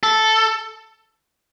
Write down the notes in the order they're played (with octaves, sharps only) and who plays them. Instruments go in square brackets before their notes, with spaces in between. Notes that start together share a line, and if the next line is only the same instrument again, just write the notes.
[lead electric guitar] A4